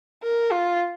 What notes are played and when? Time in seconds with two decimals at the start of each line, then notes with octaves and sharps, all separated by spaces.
0.23 A#4
0.52 F4